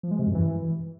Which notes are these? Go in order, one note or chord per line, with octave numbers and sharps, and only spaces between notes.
F3
G#3
C3
F#2
E3